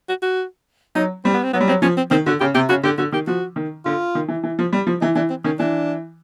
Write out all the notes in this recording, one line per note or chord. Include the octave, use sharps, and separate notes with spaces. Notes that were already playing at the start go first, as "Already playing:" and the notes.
F#4
F#4
F#3 D#4
G3 C4
B3
C4
F#3 B3
G3
F#3 C4
F3 C#4
C4
D#3 C4
D3 F#4
C#3 G4
C3 G4
C#3 F#4
D3 G4
D3 F#4
D#3 G4
F3 F#4
D#3
D3 F4
D#3
E3
E3
F3
G3
F3
E3 D#4
E3 D4
C4
D#3 C#4
E3 D4